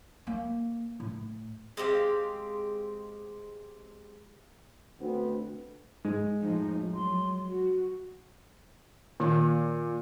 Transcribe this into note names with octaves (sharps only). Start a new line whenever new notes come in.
A#3
A2
G#3 C4 G4 F5
D2 B3 C4
G#2 G#3
F2 A2 F3 D#4
F#3 C6
F#4
A#2 D#3